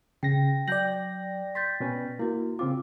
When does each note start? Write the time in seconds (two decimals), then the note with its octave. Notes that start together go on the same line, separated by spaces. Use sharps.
0.23 C#3 G5 A#6
0.68 F#3 D5 G5 G6 A#6 F#7
1.55 C6 G6 A6 B6
1.80 B2 C#4 B4
2.19 A#3 E4 F#4
2.59 C#3 C4 F4 D6